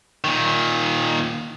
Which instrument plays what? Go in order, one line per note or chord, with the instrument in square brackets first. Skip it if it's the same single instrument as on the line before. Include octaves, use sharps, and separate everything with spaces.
[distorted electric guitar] A#2 D#3